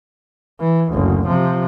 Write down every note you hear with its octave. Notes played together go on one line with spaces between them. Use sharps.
E3
F#1 D2
C3 F3